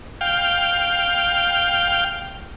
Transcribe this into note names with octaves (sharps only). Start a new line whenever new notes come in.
F5 G5